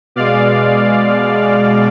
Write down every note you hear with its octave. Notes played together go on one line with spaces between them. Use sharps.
B2 G#3 D5 F5